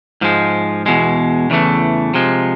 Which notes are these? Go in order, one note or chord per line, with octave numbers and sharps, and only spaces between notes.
G#2 F3 G#3
E2 B2 G#3
E2 C#3 E3 A3
C3 F3 G#3